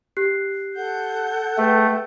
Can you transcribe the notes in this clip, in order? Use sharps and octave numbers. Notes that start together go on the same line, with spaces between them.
G4 F#6 C7
A4 F#5 G6
A3 G#4 B4 G5